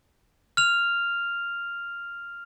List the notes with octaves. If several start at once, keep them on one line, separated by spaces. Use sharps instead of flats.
F6 F7